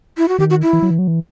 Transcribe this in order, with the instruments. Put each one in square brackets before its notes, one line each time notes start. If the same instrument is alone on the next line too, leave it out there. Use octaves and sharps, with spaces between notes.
[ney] E4
F#4
[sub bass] D#3 [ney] G4
[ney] F#4
E4
[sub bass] E3
F#3
E3
F#3
E3